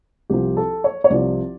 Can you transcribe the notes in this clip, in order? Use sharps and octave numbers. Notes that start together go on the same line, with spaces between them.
C2 C3 F3 G4
A4
C#5
C#5
C2 C3 F3 D5